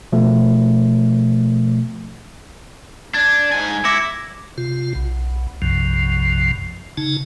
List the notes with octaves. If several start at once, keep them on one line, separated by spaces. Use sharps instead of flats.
B2 F3 A3
D4 G#6
G#2 G#5
E4 D6 A#6 C#7
C3 F4
B1
B1 F#2 C3 F3
C#3 D#4 A5